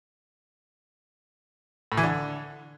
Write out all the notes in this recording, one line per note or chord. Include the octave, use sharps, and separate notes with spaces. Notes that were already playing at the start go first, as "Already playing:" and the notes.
A2
E3
D3